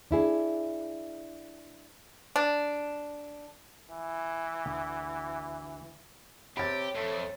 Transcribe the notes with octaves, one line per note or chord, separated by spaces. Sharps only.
D4 E4 G#4
D4
E3
D2
C3 G4 C#5 B5 A6
F2 A3